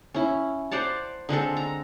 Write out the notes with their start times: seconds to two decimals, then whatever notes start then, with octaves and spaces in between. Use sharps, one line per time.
0.14 C#4 E4
0.71 C5 D5 F#5 A5
1.29 D3 G#3 C4 A4
1.57 A#5